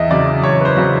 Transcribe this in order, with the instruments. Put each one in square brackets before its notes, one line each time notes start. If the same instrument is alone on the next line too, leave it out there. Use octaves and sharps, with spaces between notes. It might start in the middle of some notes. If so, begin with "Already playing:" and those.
Already playing: [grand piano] E2 D#5 E5
C#3 F#3 D5
E2 C#5
B4
C5
C#3 F#3